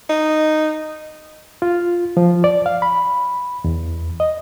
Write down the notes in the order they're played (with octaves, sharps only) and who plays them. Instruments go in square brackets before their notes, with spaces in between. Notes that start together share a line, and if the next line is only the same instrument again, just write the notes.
[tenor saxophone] D#4
[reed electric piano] F4
F3
D5
F5
B5
E2
D#5